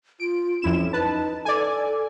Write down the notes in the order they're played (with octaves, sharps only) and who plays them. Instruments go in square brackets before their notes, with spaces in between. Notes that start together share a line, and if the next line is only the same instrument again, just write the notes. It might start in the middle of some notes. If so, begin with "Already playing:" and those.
[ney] F4 [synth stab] D7
[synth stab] F2 E4 E7 [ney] C#4
[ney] D#4 [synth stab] B4 A5
[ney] A4 [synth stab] D5 G#5